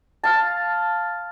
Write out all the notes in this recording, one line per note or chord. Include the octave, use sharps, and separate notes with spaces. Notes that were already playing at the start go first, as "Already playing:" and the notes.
F5 A5